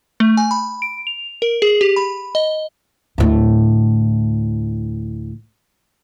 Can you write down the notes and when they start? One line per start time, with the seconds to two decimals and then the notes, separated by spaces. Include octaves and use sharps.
0.20 A3
0.37 G#5
0.51 B5
0.82 D7
1.07 F7
1.42 A#4
1.62 G#4
1.81 G4
1.96 B5
2.35 D#5
3.18 D2 A2